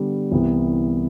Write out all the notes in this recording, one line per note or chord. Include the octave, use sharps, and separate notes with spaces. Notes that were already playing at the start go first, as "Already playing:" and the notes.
Already playing: D3 G3 B3 D4
C2 C3 E3 B3